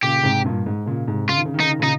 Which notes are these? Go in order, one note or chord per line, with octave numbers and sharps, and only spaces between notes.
A#2 C#3 G4
G#2 C3
G2 A#2
G#2
A#2 C#3
G#2 C3
C#3 F4
D#3
C#3
D#3
C#3 D#4
D#3
A#2 C#3
D#4